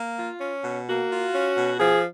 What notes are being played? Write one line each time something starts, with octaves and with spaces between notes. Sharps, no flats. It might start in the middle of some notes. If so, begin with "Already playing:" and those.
Already playing: A#3
F4
C#4
B2
A#3 F#4
F4
C#4
B2
F3 G#4